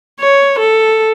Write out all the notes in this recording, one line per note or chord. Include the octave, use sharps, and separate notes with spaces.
C#5
A4